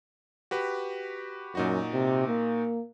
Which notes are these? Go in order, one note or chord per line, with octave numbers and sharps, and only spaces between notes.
F#4 G4 B4
F#2 A#2 D#4 F#4
C3
A#3